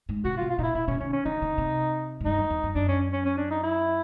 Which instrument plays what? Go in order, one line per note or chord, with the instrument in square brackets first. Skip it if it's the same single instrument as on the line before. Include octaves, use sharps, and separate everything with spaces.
[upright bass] G#2
[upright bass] C3 [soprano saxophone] F#4
[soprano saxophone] F4
[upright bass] B2
[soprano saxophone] F4
[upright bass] A#2 [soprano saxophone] D#4
[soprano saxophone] E4
[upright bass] A#2 [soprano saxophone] E4
[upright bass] B2 [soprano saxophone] C#4
[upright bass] D#3 [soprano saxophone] C#4
[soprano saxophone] C#4
[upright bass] D3 [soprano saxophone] D#4
[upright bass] C#3
C3
G#2
[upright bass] G2 [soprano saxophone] D#4
[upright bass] F2
E2
F#2
[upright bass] F#2 [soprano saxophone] D4
[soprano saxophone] C#4
C#4
C#4
D4
D#4
E4